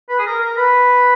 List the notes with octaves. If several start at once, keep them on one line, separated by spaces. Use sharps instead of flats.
B4
G#4
A#4
A#4
B4